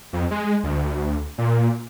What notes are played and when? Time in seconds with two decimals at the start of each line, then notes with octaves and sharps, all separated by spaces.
0.13 F2
0.31 G#3
0.64 D2
1.38 A#2